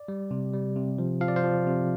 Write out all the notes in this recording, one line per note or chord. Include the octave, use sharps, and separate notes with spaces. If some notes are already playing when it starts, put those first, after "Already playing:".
Already playing: D5
G3
C3
G3
C3
F3
F3 F5
D5
C5 F5
F3
C3